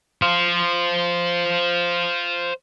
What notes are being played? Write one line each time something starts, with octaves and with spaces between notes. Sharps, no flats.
C5 F5